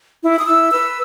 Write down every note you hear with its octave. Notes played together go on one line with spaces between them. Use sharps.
E4
D#6
E4 E6
B4 E6